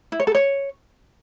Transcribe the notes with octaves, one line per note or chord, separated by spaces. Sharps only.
E4
C#5
A4
C#5